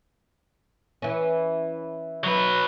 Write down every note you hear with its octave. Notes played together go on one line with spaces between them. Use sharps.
E3 C#4
F#3 B4